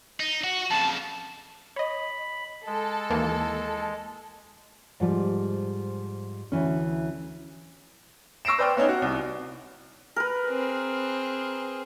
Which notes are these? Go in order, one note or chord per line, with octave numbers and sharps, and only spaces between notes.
D#4
F#4
F2 C#3 A5
C#5 D#5 B5
G#3 A4
D#2 E3 A#3
G#2 F3 G3
D2 E3 C#4
C#6 E6 A#6 C7 D7 E7
B4 C5 D5 G5 F6
B3 C#4 D#4 C#5
F#4
C2
A#4 B4
C4 G#4